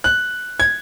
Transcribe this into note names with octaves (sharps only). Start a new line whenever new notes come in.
F#6
G#6